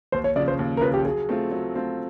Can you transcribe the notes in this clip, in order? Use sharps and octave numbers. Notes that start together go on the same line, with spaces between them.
D#2 C5
C#5
C#3 F3 D5
C5
D#2
A#4
C#3 F3 B4
G4
F#3 G#4
A3 C4 F4
F#3
A3 C4 F4